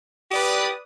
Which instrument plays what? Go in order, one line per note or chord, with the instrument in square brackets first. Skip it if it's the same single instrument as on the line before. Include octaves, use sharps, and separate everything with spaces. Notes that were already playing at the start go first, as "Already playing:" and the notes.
[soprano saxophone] G4 [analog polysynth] B4 D5 D#6